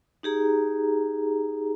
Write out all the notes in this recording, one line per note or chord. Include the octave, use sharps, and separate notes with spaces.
D#4 G4 G#4 A#5